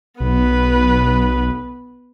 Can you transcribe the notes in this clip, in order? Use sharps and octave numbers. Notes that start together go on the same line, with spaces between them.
B1 B3 B4